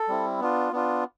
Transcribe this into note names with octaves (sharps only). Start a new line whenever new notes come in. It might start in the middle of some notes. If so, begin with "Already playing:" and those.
Already playing: A4
G3 C4 E4
B3 D4 F4
B3 D4 F4